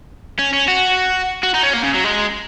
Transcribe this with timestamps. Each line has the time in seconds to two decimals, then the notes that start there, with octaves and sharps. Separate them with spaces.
0.39 C#4
0.53 C#4
0.68 F#4
1.43 F#4
1.54 D#4
1.63 C#4
1.73 A#3
1.83 C#3
1.95 F#3
2.04 G#3